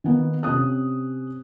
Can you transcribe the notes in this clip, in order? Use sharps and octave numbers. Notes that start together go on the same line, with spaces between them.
D#3 A#3 B3
C3 C#4 D#6 F#6